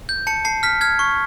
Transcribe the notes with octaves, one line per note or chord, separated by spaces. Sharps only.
G6
A5 C#7
A5 C7
F6 B6
F6 G#6
C#6